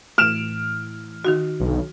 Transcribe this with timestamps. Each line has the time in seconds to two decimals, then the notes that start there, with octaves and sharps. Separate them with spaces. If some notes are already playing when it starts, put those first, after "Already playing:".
0.18 A2 E3 F6 D7 E7
1.25 D#3 D#4 F#4
1.60 B1 D3